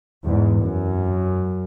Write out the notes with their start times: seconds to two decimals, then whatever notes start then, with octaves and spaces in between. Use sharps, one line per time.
0.24 E2 G#2
0.61 F#2